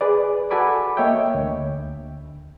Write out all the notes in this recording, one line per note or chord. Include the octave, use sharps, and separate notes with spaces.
G#4 B4 D5
F#4 A4 G#5 B5 D6
A#3 C#5 D#5 E5 G5
D2